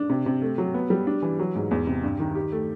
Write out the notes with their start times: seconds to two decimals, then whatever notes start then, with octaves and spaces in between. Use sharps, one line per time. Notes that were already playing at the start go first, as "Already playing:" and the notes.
Already playing: D4
0.10 C3
0.26 C3
0.42 A3
0.58 F#3
0.74 B3
0.90 G3
1.07 D4
1.22 E3
1.39 F#3
1.55 G#2
1.71 E2
1.87 C3
2.03 G2
2.20 D#3
2.35 G4
2.52 A3